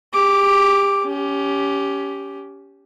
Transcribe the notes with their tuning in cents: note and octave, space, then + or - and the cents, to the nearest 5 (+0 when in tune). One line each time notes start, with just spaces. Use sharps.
G4 +30 D6 +0
C#4 +20 G4 -5